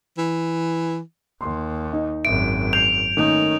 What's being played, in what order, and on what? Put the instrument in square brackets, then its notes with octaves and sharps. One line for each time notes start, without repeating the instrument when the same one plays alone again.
[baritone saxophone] E3
[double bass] D#2 [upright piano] C6
[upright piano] D#4
[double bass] G#1 F#2 [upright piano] E5 [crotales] D7
[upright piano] G6 C7 [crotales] F7
[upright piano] D#3 A3 A#3 [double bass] C#4 D#4